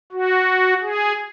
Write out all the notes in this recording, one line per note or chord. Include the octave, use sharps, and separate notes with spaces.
F#4
G#4